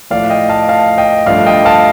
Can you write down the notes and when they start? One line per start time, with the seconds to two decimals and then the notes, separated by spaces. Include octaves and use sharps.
0.11 A2 F3 A3 D5 F5
0.30 D#5 G5
0.49 F5 A5
0.69 F5 A5
0.98 D#5 G5
1.26 G2 F3 A3 D4 D5 F5
1.46 D#5 G5
1.65 F5 A5